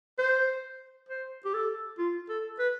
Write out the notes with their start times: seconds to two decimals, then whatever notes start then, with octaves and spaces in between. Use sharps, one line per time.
0.18 C5
1.09 C5
1.45 G4
1.54 A4
1.98 F4
2.29 A4
2.59 B4